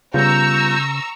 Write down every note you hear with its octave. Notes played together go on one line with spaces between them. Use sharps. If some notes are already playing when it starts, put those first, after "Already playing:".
C#3 G3 B3 F4 A#5 C#6 E6 G6